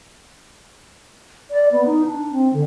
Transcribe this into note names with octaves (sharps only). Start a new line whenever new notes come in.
D5
B3
D#4
D4
C4
D3